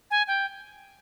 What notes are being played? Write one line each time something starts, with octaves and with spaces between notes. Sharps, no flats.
G#5
G5